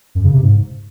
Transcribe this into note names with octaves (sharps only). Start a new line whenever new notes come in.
F#2
C#3
C3
G#2